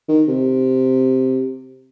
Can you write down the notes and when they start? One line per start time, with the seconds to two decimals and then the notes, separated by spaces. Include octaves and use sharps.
0.08 D#3
0.28 C3